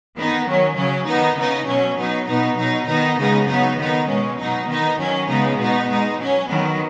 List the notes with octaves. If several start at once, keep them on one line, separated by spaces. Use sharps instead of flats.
D#3 B3 D#4
D#3 F#3 C#4
C#3 F#3 C#4
D#3 B3 D#4
C#3 B3 D#4
B2 F#3 C#4
F#3 B3 D#4
B2 B3 D#4
B2 F#3 D#4
D#3 B3 D#4
C#3 G#3 B3 D#4
F#3 B3 D#4
D#3 B3 D#4
B2 G#3 C#4
B2 F#3 D#4
D#3 B3 D#4
D#3 F#3 C#4
C#3 G#3 B3 D#4
B2 B3 D#4
B2 G#3 D#4
F#3 C#4
D#3 F#3 B3